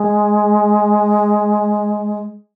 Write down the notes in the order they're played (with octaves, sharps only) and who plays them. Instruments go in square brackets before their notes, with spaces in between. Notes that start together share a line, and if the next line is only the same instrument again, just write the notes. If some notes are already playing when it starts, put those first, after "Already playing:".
Already playing: [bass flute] G#3